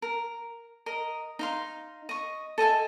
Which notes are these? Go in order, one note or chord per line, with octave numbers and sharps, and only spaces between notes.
A#4
A#4 D#5
D#4 F5 C6
D#5 C#6
A4 D#5 E5 G#5